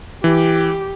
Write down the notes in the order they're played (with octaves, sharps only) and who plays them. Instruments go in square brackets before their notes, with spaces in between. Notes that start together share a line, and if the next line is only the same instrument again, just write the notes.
[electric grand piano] E3 [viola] G4